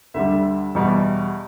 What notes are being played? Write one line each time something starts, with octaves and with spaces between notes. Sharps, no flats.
D2 D3 G3 E5
E2 B2 G3